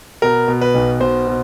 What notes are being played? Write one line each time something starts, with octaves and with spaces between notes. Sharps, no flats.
B2 A#4
B2
B4
B1
B2 C5
B2